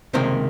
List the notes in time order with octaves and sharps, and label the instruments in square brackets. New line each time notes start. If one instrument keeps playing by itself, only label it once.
[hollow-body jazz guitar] C#2 C3 D#3 A#3 C5